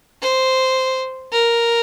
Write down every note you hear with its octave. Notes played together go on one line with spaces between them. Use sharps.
C5
A#4